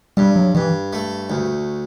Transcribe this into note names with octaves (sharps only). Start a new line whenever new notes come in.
G2 G3
F#3
G2 E3
A3
D2